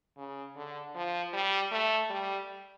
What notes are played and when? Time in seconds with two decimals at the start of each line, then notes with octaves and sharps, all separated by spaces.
0.18 C#3
0.56 D3
0.95 F3
1.33 G3
1.72 A3
2.10 G3